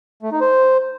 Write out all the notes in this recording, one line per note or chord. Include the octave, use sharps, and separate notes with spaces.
A3
D#4
C5